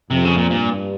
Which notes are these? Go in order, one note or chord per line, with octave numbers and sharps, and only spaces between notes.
F2 C3
C#3
A#2
G2 A#2